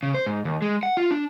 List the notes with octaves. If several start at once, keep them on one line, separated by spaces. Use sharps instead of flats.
C#3
C5
G#2
D#2
G#3
F#5
F4
D4